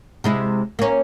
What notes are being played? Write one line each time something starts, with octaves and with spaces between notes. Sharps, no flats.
C3 G#3 E4
A#3 C#4